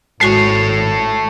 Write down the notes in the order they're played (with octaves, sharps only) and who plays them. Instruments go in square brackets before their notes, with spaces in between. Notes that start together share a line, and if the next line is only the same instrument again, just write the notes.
[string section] G#1 [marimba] G#3 F#4 A5 [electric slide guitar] A4 C#5 [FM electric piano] C7